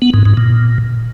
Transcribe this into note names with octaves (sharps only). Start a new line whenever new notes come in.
B3
G#2
G#2
A#2